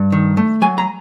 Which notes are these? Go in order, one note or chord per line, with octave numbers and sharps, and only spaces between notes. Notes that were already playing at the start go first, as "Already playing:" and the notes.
Already playing: G2
D#3
A3
F#3 G#5
A#5